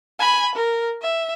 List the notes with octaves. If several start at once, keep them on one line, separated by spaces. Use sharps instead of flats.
G#5 B5
A#4
E5